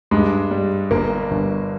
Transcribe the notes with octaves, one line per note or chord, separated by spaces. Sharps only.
G2 G#3
G3
G1 A#3
G1